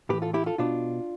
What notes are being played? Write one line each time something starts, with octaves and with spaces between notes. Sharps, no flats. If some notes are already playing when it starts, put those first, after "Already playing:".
A2 E3 G4 B4
F4 A4
E4 G4
F4 A4
B2 D4 F4